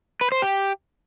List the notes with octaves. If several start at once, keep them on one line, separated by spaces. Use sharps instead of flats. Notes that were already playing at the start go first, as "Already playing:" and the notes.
B4
C5
G4